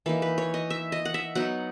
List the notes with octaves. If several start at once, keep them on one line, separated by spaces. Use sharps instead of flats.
E3 A#3 D#4 B4
B4
C#5
D#5
E5
D#5
F#5
E5
F#3 B3 D#4 F#5